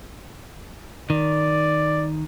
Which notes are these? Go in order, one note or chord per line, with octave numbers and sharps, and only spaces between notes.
D#3 D5